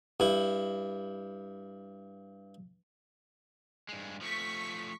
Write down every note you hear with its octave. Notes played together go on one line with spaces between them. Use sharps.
G2 E4
G2 G#3
F3 A3 C#6 B6